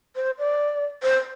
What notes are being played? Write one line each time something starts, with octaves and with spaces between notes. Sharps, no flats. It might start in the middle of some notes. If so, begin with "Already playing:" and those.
C5
D5
C5